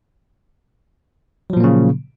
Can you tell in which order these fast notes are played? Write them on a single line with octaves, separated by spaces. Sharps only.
F#3 F3 A#2 A#3 C#3